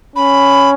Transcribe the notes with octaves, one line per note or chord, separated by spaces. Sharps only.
C#4 B5